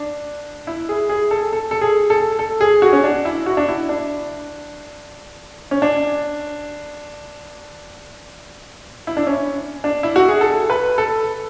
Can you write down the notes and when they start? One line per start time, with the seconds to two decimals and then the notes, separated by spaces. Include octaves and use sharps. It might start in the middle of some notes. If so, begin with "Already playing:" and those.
Already playing: D4
0.67 E4
0.89 G#4
1.09 G#4
1.31 A4
1.53 A4
1.71 A4
1.81 G#4
2.10 A4
2.39 A4
2.61 G#4
2.82 F#4
2.93 C#4
3.04 D4
3.25 E4
3.46 F#4
3.57 D4
3.68 E4
3.89 D4
5.71 C#4
5.82 D4
9.07 E4
9.17 D4
9.27 C#4
9.84 D4
10.03 E4
10.16 F#4
10.29 G#4
10.41 A4
10.70 B4
10.98 A4